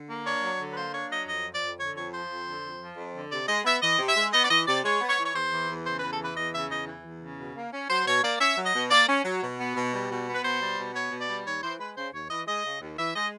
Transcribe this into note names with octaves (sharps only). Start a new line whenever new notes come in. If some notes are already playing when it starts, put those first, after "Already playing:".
Already playing: D3
A#3
D4 C#5
F#3
D3
B4
A#3 C5
D4 C#5
F#3 D#5
F2 D#5
F3
D5
F2
D3 C#5
F2 C#5
F3 C5
F2
D3
F2
F3
F2
D3
C3 D5
G#3 D#5
B3 E5
E3 D#5
C3
E5
G#3
B3 D#5
D5
E3 D#5
C3 D5
G#3 C#5
B3
C#5
E3
C#5
E2 C5
E3
E2
C#3 C5
B4
E2
A4
E3 B4
E2 D#5
C#3 E5
E2 D#5
E3
E2
C#3
B2
A#3
C#4
F#3 C5
B2 C#5
A#3 D5
C#4 E5
F#3
D#5
B2
A#3 D5
C#4
F#3
B2
B3
B2
G3
B2
B3
B4
B2 C5
G3
B2
B3 C#5
B2
D5
G3
D#2 C#5
E3 C5
G#3 B4
C#3 C5
D#2 C#5
E3 D#5
G#3 D#5
C#3
D#2
E3 E5
G#3 D#5